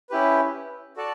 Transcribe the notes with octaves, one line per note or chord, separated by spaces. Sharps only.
C#4 E4 G4 B4
F#4 A4 D5 A5